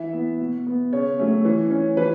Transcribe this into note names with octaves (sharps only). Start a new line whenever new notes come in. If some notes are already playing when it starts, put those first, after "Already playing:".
Already playing: E3 E5
B3
B2
B3
C#3 C#5
F#3 A3 C#4
E3
C#4
E3 B4